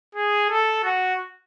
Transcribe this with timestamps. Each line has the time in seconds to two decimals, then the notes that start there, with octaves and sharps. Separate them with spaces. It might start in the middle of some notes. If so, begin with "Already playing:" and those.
0.15 G#4
0.49 A4
0.83 F#4